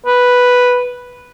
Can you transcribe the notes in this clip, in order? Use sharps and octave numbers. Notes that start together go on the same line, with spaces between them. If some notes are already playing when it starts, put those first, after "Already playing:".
B4